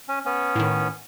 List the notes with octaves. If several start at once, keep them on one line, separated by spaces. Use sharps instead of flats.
C#4
B3 C#4
A2 D#3